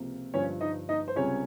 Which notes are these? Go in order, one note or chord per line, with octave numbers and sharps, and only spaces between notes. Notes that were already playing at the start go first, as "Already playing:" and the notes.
Already playing: C#2 C3 F3 A#3
G1 G2 F3 C#4 C#5
D#4 D#5
D#4 D#5
C5
C#2 C3 G3 C4 C#4 C#5